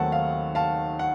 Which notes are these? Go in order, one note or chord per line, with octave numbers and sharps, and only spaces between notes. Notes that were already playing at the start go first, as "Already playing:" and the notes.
Already playing: D#2 D#3 F#3 A3 C4 F#5 A5
F5
F5 A5
F#5